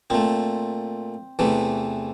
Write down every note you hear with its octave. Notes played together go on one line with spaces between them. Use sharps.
A#2 A3 C4
E2 C3 E3 A3